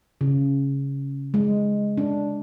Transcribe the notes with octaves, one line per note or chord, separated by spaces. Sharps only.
C#3
G#3
D4